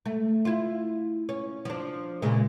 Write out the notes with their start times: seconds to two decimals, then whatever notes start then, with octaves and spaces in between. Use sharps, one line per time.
0.06 A3
0.45 E4 F4
1.29 C#4
1.65 F3 D4
2.22 A#2 C#3 G#3